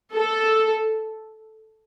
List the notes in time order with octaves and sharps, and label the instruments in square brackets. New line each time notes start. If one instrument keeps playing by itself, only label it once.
[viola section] A4